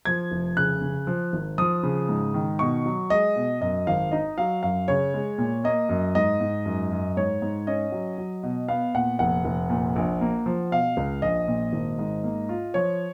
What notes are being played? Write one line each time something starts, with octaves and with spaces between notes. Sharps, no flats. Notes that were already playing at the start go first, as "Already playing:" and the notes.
F3 G#6
F1
C#3 F#6
C#3
F3
G#1
F3 D#6
C#3
G#2
D#3
B2 C#6
F#3
G#3 D#5
B2
F#2 D#5
G#1 F5
D#4 D#5
F#3 F5
F#2 F5
C#3 C#5
G#3
A#2
A#3 D#5
F#2
G#2 D#5
G#2
F#2
F#2
G#2 C#5
G#2
C#4 D#5
F#3
F#3
B2
B3 F5
A#2 F#5
F1 F#5
F1
A#2
A#1
A#3
F3
B2 F5
C#2
A#1 D#5
A#2
G#1
G#2
A#3
F4
F3 C#5